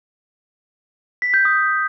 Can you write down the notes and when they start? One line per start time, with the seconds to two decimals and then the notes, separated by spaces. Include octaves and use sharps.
1.22 B6
1.34 G6
1.45 D#6